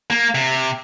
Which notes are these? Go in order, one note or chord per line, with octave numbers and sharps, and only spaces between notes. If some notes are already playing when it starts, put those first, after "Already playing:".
A#3
C3